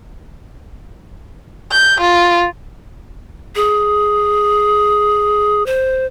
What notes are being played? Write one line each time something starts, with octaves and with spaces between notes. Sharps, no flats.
G6
F4
G#4
C5